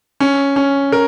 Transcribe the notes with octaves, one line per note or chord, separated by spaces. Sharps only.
C#4
C#4
A#4